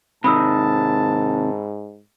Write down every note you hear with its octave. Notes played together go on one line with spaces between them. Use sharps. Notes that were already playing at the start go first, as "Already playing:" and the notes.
G#2 C3 D#3 A5 B5 D#6 E6